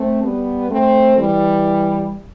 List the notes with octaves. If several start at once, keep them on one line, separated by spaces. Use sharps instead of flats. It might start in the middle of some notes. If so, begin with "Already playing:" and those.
Already playing: A3 C4
G3 B3
A3 C4
E3 G3